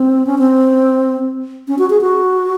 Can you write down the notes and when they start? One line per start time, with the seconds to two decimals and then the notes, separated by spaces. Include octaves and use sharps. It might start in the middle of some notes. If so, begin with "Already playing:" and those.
Already playing: C4
0.27 C#4
0.38 C4
1.68 C#4
1.79 F#4
1.90 G#4
2.01 F#4